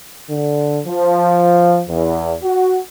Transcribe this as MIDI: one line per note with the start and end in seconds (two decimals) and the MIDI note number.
0.30 0.81 50
0.87 1.82 53
1.88 2.35 40
2.43 2.79 66